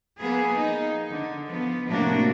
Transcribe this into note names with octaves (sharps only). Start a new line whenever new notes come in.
F3 A#3 B3 G#4
D#4
D3
F3 B3
A2 C3 A3 A#3 D4 F#4